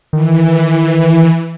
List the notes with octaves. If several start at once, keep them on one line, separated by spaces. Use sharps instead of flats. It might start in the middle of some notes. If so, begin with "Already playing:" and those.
D#3 E3